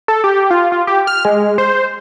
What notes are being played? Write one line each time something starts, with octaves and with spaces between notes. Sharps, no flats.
A4
G4
F4
F4
G4
F6
G#3
C5